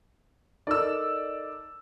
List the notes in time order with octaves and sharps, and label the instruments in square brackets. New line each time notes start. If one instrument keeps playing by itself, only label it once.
[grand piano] D#4 A4 A#4 [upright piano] D5 E6